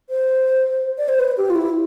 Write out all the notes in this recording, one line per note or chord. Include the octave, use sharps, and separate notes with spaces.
C5
D5
C5
B4
G4
F4
E4